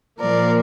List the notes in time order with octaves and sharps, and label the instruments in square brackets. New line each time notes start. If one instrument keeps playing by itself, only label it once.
[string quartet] A#2 F3 A#3 A#4 D5